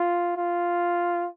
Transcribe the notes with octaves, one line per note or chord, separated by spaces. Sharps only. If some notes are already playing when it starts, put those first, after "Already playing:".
Already playing: F4
F4